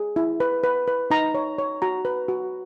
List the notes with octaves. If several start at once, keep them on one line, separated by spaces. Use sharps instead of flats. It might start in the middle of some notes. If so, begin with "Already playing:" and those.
Already playing: G#4
E4
B4
B4
B4
D#4 A#5
C#5
C#5
F#4 A#5
B4
F#4